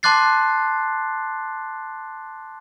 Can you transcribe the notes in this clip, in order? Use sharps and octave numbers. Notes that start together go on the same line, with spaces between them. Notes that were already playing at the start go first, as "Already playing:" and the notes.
A5 C6 D6 F#6 A6 C7